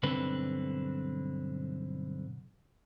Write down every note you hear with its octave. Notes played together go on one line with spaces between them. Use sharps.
B1 G2 D3 C4 B4